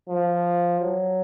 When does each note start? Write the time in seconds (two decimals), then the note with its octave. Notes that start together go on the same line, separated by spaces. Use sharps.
0.09 F3
0.81 F#3